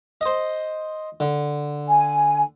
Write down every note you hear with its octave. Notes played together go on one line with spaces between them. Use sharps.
C5 D#5
D3
G#5